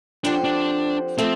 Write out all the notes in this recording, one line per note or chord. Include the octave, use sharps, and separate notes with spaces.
D3 F3 C4 D4 G4 C5
D4
F3 A3 C4